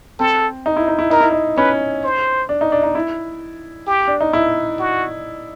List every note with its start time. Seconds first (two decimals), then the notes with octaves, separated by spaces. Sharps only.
0.19 C4 A4
0.66 D#4
0.76 E4
0.88 D#4
0.99 E4
1.10 D#4 A#4
1.20 E4
1.32 D#4
1.57 C#4 B4
2.03 C5
2.49 D4
2.61 D#4
2.72 D4
2.83 D#4
2.95 E4
3.87 G4
4.08 D4
4.21 D#4
4.33 E4
4.79 F#4